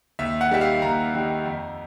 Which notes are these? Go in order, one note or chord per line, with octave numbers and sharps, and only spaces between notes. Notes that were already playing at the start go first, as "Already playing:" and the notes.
D#2 E5
F#5
D#3 G3 E5
F5
D#2 A#5
D#3 G3
F2